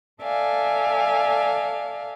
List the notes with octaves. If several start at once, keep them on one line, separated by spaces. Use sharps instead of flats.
A4 D5 E5 F5 G#5